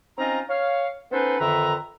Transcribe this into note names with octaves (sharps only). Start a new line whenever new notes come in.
C4 C#4 D#4 F4 D#5 A#5
C#5 F5
B3 C#4 D#4 A4 B4 C5
F2 D3 D#3 B4 E5 A#5